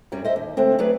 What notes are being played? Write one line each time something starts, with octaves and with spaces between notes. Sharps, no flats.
F#2 F#3 G3 C#4
C5 D#5 E5
D#2
D3 G#3 A3 C4
F#3 A3 G#4 B4 D5